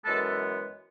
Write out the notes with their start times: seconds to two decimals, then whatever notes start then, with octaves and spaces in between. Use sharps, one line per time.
0.05 F#2 E3 G#3 B3 A4
0.22 A4